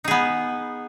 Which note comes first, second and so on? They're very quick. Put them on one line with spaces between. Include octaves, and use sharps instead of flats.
D#4 G#4 B3